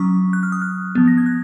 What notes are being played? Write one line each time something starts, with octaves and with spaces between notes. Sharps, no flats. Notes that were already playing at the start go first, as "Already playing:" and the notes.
Already playing: F#3 C#4 C#6 D#6
F#6
F6
D#6
F6
F3 B3
A#6
G#6
F#6